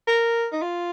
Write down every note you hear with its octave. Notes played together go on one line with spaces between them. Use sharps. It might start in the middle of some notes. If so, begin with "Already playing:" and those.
A#4
D#4
F4